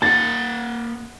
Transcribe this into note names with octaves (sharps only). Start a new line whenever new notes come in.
A#3 F#5 A6